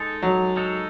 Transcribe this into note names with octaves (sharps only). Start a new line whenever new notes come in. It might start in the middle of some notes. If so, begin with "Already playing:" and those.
Already playing: G#3 D#4 A4
F#3
G#3 D#4 A4